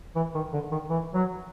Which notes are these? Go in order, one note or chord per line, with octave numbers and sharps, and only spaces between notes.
E3
D#3
D3
D#3
E3
F#3